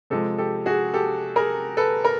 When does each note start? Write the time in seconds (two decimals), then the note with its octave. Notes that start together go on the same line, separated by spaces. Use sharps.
0.10 C3 F3 G#3 G4 A4
0.38 G4 A4
0.66 F#4 G#4
0.94 G4 A4
1.36 G#4 A#4
1.77 A4 B4
2.05 A#4